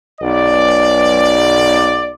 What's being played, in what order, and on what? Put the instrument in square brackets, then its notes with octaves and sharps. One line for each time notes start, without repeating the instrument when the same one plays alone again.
[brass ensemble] B1 D5